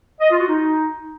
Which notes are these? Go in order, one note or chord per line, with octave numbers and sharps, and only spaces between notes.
D#5
F4
F#4
D#4